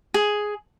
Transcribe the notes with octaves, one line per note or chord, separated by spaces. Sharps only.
G#4